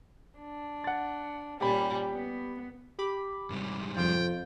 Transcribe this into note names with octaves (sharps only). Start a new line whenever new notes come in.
D4
F#5 A6
A#2 G3 C#4 G4 B5
B3
G4 B5 D6
G#2 C3 G3
F2 F3 F4 G5